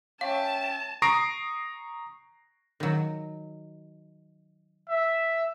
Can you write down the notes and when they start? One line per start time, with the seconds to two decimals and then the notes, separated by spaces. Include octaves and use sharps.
0.21 C#4 E5 F5 G5 A5
1.02 A#5 C#6 D#6 A#6 C7 D7
2.80 D#3 F#3
4.89 E5